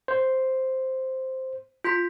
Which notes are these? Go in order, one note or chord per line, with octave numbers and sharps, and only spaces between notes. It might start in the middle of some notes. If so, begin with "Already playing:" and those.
C5
F4 C6 B6